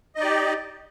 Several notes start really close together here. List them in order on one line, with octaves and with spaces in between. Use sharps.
D#5 D#4 D5 G4